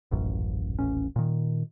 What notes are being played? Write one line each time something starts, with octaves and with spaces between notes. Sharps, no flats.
D#1 A1 F#2
D#1 A1 C#4
A#2 D#3